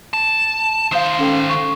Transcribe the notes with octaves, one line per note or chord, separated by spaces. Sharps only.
A5
D#3 C5 F5 D#6
C#4 A4 G5
C#6